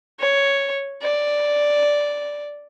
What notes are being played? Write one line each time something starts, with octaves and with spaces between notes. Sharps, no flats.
C#5
D5